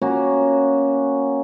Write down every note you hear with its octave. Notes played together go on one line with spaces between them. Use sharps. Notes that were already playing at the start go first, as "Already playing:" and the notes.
A#3 C#4 F#4